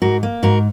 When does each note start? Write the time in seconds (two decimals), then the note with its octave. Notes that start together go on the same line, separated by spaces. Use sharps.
0.02 G#2 F#4 A#4
0.23 A#3
0.43 G#2 F#4 A#4